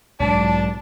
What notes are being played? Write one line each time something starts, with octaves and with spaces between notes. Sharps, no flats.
B1 G#2 F#3 D4 A5